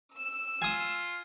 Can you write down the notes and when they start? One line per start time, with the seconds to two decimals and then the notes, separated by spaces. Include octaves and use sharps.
0.17 E6
0.62 F4 G#5 D#6